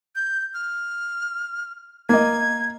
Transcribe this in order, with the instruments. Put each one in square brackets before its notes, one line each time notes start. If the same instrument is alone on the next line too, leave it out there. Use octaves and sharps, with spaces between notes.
[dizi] G6
F6
[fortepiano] A#3 D#5 [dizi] G#6